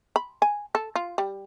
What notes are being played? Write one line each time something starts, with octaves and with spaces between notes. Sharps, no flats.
B5
G#5
A4
F4
G3